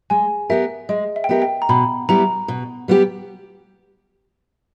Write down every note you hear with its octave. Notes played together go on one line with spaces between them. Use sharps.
G#3 G#5
B3 G4 A#4 E5
G#3 D#5
E5
G5
B3 G4 A#4 E5
G5
A#5
B2 B5
G3 B3 E4 G4 A#5
B2
G3 B3 E4 G4